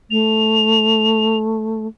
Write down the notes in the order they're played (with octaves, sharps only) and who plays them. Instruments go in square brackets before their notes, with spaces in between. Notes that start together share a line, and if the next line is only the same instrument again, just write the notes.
[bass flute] A3 [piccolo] F7